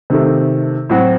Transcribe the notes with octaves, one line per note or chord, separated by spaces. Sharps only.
C3 D#3 A3
A2 F#3 C4 F#4